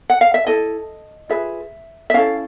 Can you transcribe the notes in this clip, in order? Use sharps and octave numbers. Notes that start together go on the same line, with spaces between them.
F#5
F5
E5
E4 A4 D#5
F4 G#4 B4 E5
E5
C#4 E4 A4 F5